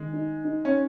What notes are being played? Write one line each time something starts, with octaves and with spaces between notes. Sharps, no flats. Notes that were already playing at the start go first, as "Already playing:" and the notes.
Already playing: D#3 G#3
D#4
D#4
C#4